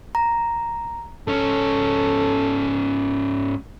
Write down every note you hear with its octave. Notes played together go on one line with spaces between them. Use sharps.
A#5
G#2 C#4 A4